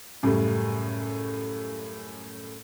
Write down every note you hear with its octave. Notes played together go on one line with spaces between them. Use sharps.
F#2 A2 C#3 G3